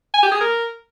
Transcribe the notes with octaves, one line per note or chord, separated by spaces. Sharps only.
G#5
G4
G#4
A#4